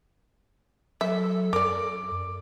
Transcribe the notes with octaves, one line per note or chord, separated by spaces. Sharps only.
F#3 A4 E5
F#2 A#4 D5 D6